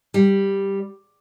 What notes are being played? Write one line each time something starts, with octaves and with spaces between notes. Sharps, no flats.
G3